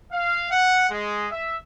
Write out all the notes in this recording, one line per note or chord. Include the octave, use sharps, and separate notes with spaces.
F5
F#5
G#3
E5